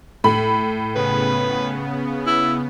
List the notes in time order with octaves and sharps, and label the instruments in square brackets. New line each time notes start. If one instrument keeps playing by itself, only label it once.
[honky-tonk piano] A2 B5
[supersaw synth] C#3 B3 [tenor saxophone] B4
[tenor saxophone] E4